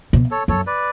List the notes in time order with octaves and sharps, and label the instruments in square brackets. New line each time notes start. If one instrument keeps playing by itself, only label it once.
[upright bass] B2
[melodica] A4 C#5
[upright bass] F#2 [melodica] A4 C#5
[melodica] B4 D5